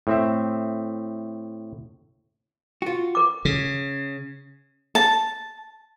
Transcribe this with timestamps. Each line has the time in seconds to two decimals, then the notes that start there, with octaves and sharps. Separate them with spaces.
0.07 A2 C4 E5
2.82 F4 F#4
3.15 A#4 D6
3.45 C#3
4.95 A5